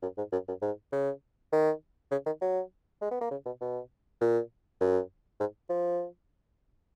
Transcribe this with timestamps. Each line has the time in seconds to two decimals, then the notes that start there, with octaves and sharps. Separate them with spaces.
0.02 F#2
0.18 G#2
0.32 F#2
0.48 F#2
0.62 G#2
0.92 C#3
1.52 D#3
2.11 C#3
2.26 D#3
2.42 F#3
3.01 G#3
3.11 B3
3.21 A#3
3.31 C#3
3.45 B2
3.61 B2
4.21 A#2
4.81 F#2
5.40 G#2
5.69 F3